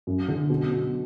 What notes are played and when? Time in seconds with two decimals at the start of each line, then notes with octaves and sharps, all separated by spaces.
0.07 F#2
0.28 D3
0.50 B2
0.71 B2